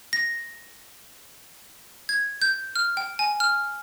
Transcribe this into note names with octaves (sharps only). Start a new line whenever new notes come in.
A#6
G#6
G6
F6
G5
G#5
F6